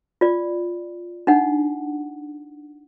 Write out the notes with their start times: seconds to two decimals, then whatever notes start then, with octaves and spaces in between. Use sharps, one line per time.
0.21 F4 D5
1.27 D4 D#4 F#5